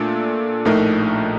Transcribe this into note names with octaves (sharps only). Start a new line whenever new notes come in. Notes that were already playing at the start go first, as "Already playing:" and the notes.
Already playing: A#2 A3 D4 A4
A#1 A2 A3 D#4 A#4